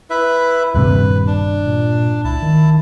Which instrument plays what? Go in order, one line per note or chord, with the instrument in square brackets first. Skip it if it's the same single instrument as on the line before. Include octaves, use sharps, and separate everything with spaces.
[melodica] E4 B4 E5
[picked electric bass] D#1 G2 C3 [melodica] B4
[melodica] D4
[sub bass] A#2
[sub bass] C#2 [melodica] E4 A5
[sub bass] D#3